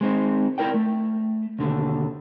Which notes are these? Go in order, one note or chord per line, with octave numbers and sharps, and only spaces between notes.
G#3 C4 D#4
E4 A#4 D5 G5
A3
D#2 B2 D3